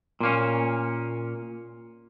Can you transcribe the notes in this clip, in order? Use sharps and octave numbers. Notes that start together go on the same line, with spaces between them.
A#2 A#3 C#4